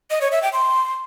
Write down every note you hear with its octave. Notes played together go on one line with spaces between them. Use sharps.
D#5
C#5
E5
G5
C6